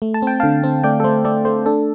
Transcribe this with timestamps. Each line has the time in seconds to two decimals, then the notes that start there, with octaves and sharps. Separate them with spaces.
0.02 A3
0.14 A5
0.22 C4 G5
0.40 D3 F5 A5
0.64 C4
0.84 A3 D5 G5
1.00 A4
1.04 A3 C5
1.25 A3 A4 D5
1.45 A3 C5
1.66 D4 A4